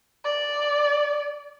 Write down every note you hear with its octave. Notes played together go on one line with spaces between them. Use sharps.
D5